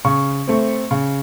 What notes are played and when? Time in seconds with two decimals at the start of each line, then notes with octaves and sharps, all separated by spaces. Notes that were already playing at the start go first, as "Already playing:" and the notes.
0.05 C#3 C#6
0.48 A3 C4
0.91 C#3